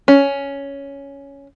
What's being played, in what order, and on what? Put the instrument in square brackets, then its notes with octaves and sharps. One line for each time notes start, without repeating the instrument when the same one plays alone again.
[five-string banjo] C#4